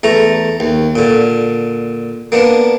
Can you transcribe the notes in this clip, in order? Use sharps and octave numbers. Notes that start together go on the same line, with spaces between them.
E2 A3 A#5
D#2
A#2 D3
A#3 B3 D4